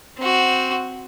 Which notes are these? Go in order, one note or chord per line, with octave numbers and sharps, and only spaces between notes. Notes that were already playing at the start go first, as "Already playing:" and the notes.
C4 F#4